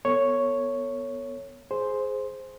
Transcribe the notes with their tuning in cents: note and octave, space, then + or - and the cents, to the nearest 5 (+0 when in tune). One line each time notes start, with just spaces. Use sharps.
B3 +0 A4 +35 C#5 +0
G#4 +10 C5 +0